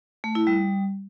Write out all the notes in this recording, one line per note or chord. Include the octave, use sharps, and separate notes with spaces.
A3
E4
G3